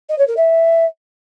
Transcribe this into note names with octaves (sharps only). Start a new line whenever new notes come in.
D#5
C#5
A#4
E5